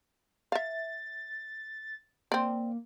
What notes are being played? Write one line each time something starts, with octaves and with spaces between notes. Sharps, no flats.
E5 F5 A6
A#3 C4 D5